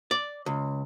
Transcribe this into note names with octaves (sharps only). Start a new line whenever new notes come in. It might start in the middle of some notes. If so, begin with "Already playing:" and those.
D5
C#2